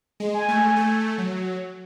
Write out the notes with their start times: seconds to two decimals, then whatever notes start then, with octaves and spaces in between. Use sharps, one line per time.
0.20 G#3
0.34 G#5
0.48 A3
0.76 A3
1.18 F#3